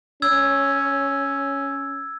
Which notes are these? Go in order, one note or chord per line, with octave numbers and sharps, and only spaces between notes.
C#4 E6 G#6